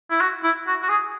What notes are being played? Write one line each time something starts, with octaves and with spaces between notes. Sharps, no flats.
E4
F#4
E4
F#4
F#4
G#4